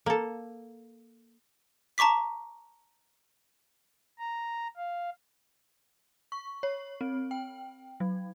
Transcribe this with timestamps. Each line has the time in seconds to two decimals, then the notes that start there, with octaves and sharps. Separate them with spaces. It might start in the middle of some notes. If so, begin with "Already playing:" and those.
0.06 A#3 A4
1.98 A5 A#5 C#6 D6 B6
4.19 A#5
4.77 F5
6.32 C#6
6.63 C#5
7.01 C4
7.31 G5
8.00 F#3